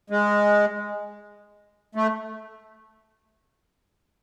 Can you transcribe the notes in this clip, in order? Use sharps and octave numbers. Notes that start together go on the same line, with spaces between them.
G#3
A3